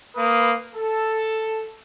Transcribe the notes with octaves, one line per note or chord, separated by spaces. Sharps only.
A#3 B4 D#6
A4